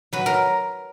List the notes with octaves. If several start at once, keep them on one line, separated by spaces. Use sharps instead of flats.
F#3 B4
A#4